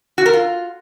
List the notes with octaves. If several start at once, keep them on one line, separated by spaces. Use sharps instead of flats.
F#4
A#4
F4